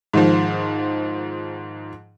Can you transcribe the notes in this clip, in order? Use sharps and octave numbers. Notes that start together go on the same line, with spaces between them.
G#2 D#3 F3